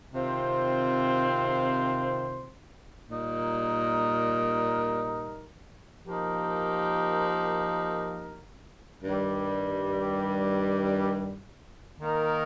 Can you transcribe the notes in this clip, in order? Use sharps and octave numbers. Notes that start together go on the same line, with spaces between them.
C3 D#3 C4 F4 C5
A#2 G3 D#4 A#4
F3 A#3 D#4 G4 A#4
G2 D#3 G3
D#3 A#3 D#4 A#4